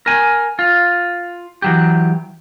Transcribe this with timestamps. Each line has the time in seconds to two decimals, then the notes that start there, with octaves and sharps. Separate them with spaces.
0.06 A#4 G#5
0.59 F4
1.62 E3 F#3 G4